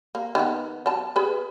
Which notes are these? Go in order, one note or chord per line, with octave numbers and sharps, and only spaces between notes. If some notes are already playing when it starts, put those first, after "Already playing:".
A#3
D#3 B3
F#3 A5
G#4 B4